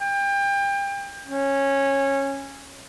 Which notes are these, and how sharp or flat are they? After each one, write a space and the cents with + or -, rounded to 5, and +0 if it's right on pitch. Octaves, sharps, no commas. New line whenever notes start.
G5 +30
C#4 -15